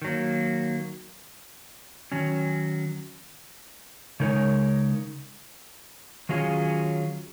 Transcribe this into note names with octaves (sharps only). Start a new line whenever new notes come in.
D#3 F#3 A#3
D#3 F#3 C#4
C#3 G#3 D#4 A#4 C#5
D#3 F#3 C#4 F4 G#4